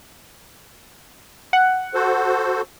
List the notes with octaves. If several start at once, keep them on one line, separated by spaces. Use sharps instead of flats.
F#5
F#4 A4 C5